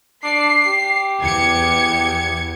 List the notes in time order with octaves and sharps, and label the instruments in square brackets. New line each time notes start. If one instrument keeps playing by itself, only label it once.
[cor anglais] D4 [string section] C7
[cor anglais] G4
[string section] E2 G#6 C#7